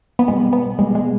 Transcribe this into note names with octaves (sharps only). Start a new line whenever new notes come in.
B3
B1 B2 G3 G#3
B3
B1 B2 G3 G#3
G#3